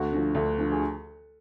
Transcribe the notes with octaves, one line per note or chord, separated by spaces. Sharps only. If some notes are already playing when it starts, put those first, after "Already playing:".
Already playing: D2 F#4
D3 F3
D2
D3 F3
G#4